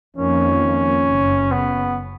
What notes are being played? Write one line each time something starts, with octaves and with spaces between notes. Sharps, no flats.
F2 D#3 A#3 C#4
F#1 F#2 C#3
B3